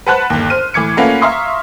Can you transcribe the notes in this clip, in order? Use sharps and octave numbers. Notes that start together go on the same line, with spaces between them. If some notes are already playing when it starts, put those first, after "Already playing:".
B4 C5 F#5 A5 B5 F#6
G1 D#2
C5 F6 D#7
A2 E3 D6 G#6 C#7
A3 A#3 C#4 F4 B4 F#5
E5 F5 A#5 C6 C#6 D#6